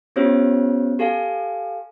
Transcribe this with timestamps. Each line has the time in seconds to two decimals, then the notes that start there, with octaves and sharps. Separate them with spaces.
0.16 B3 C#4 F4 G4 C5 C#5
0.99 G4 A4 F5 G#5